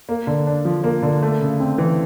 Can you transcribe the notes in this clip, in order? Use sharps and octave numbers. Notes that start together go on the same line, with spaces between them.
A#3
D3
D4
F3
A#3
D3
A3
C#3
C4
E3